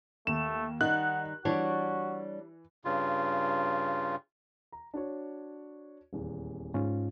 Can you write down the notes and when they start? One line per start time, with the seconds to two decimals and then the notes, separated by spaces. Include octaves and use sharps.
0.27 D#2 A3 E7
0.81 D#3 G3 D#4 F#5 F#6
1.45 E3 G3 D4 F#4 C#5
2.85 G2 C#3 F4
4.72 A#5
4.94 D4 F#4 C#5
6.13 D#1 E2
6.74 G#2 C#4 F4